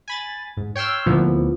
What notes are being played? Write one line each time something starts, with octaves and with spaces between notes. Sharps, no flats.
G#5 B5 A6
G#2
C#5 G5 C6 E6 F6
D2 A#2 E3 F3 B3